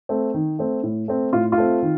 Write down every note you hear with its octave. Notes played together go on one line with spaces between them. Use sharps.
A3 C4
D#3
A3 C4
A2
A3 C4
A2 F4
F4
A3 C4
D#3